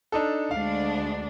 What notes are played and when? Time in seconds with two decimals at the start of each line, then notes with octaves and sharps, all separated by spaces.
0.12 D4 D#4 A4
0.51 D2 G#3 D4 F5